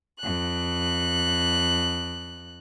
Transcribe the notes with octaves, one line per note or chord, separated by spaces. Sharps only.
F2 F#6